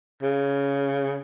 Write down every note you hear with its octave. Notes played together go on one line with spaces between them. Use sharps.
C#3